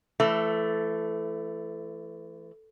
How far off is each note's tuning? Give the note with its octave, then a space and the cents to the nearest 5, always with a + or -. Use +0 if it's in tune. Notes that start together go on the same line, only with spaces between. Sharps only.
E3 +25 A3 +0